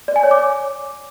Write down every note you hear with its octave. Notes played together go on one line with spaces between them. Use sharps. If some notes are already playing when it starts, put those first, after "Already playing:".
D5
G#5
C#5
D6